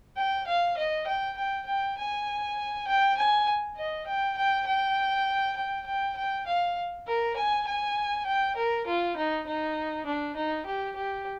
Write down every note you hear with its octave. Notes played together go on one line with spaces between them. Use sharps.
G5
F5
D#5
G5
G5
G5
G#5
G5
G#5
D#5
G5
G5
G5
G5
G5
G5
F5
A#4
G#5
G#5
G5
A#4
F4
D#4
D#4
D4
D#4
G4
G4